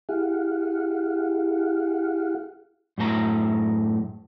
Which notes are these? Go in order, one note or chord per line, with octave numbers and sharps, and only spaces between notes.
E4 G4 G#4 F5 F#5
F#2 A2 G4 A#5